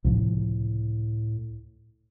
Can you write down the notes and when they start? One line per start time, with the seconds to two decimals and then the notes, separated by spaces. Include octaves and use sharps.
0.05 C#2 A2 C3 F3